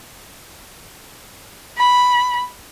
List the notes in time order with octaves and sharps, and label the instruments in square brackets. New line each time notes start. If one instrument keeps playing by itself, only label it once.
[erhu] B5